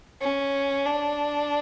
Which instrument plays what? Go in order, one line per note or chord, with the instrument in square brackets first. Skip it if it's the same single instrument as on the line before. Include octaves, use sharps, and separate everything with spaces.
[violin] C#4
D4